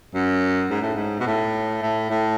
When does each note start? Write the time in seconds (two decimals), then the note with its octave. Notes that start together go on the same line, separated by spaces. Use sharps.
0.14 F#2
0.71 G#2
0.82 A2
0.95 G#2
1.20 B2
1.27 A2
1.82 A2
2.11 A2